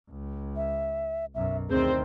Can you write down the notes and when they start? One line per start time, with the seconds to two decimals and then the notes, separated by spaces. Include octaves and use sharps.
0.10 C#2
0.56 E5
1.35 B1 F#2 E5
1.69 D2 D#3 C4 G#4 C5